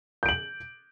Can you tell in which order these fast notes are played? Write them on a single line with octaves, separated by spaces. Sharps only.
G6 D7 F#7